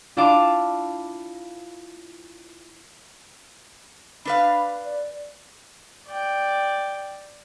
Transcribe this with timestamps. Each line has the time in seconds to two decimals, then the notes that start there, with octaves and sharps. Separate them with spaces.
0.17 D4 E4 F4 F5 A5 D6
4.25 D4 B4 F5 B5
4.85 D5
6.07 D5 G5